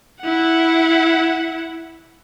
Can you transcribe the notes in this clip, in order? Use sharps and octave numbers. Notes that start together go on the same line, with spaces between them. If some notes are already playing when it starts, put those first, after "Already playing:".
E4 F#5